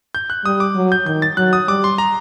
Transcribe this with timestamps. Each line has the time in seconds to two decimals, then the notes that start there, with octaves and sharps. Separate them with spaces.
0.15 G6
0.30 F#6
0.45 G3 D#6
0.60 D6
0.75 F#3
0.92 G6
1.06 D#3 G6
1.22 A6
1.37 F#3 F#6
1.53 D#6
1.68 G3 D6
1.84 C6
1.98 A#5